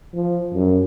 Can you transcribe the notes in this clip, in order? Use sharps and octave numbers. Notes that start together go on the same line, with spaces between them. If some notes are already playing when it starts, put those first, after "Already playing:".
F3
F#2